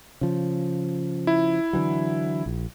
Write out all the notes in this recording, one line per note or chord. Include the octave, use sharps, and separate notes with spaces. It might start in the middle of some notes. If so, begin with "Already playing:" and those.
C#3 F3
E4
D3 E3 F#3
A#1